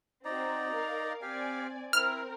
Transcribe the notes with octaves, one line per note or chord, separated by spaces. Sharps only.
C4 D#4 F#4 D5 A#5
A#4 F5
C4 G4 D5 F5 G#5
C4 E4 A#4 F6